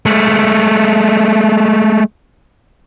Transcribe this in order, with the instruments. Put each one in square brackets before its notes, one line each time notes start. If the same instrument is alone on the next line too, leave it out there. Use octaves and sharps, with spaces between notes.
[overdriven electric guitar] G#3 A3